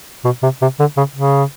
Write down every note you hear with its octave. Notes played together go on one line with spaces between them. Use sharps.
B2
C3
C3
D3
C#3
C#3